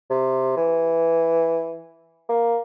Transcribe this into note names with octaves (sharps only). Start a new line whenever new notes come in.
C3
E3
A#3